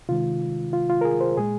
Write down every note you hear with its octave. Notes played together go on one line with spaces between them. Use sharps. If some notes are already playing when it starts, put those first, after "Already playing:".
C3 D#3 G#3 F4
F4
F4
A#4
G#4
C5
A#2 G#3 G#4